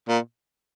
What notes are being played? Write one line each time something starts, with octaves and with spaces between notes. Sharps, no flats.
A#2